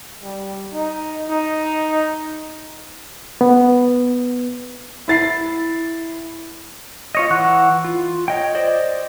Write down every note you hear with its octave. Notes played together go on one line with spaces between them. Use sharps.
G3
D#4
D#4
B3
E4 A6 C7
F4 C#5 D#5
E3 F#5 C#6 F#6
F4
C#5 D#5 G5
C5 D5 D#5